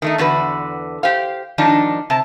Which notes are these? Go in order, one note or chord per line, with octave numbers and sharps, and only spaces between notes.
D#3 A3 D#4
E2 D3 F#4 B4
G4 C5 F5
G#2 D#3 F3 D4 D#4
C3 A5